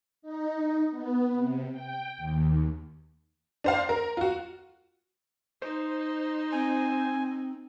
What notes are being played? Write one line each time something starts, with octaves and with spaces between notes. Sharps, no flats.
D#4
B3
C3
G5
D#2
D4 C5 F5
A#4
F4 F#4
D#4 C5
C4 G#5